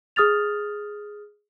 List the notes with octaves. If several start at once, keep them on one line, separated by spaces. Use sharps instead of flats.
G#4 D#6 F6 A6 F7